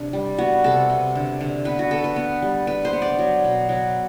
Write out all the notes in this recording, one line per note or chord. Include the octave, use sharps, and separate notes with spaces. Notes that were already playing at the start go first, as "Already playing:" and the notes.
Already playing: C3 D4
G3
B3 F#4
C3 A4
C3
D3
D3
B3 B4
F#4
B3 A4
B4
B3
G3
B3 B4
C5
B3
D5
F#3
B2
F#3